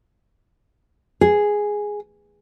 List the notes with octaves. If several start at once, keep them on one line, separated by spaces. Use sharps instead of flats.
G#4